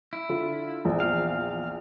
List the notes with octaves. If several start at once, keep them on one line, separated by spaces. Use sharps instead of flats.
E4
D3 F4
A#1 E2
F5